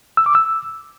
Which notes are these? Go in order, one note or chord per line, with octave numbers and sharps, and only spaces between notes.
E6
D6
E6